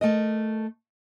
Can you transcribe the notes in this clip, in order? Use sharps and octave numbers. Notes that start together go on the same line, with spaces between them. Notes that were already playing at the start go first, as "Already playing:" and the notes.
A3 A#4 D#5